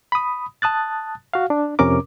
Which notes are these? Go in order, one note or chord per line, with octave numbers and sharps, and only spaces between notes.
B5 D#6
A5 D#6 F#6 A6
F#4 F5
D4
F2 C3 C#4 A#4 D6